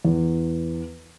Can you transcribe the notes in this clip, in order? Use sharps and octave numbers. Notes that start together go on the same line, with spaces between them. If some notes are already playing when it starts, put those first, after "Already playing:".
E2